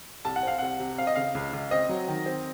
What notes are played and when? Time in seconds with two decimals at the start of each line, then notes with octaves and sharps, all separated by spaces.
0.25 C2 A5
0.36 F#5
0.43 C4 F5
0.59 C2 F#5
0.80 C3
0.98 C4 F5
1.07 D#5
1.15 C#3 F5
1.35 C#2
1.53 C#2
1.71 C4 D#5
1.89 F#3
2.08 D#3
2.26 C4